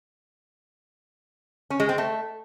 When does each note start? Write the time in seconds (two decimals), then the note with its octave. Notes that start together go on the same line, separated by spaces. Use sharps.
1.70 C#4
1.80 G#3
1.89 C4
1.98 A3